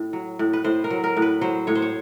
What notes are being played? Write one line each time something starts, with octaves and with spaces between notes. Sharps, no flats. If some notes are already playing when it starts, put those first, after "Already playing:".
Already playing: A2
F#3
A2
B4
A2 C5
A#4
F#3
A#4
A2
B4
F#3 C5
A2 C#5
C5
C#5